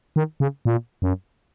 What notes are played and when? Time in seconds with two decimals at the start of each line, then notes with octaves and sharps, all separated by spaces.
0.16 D#3
0.40 C#3
0.65 A#2
1.02 F#2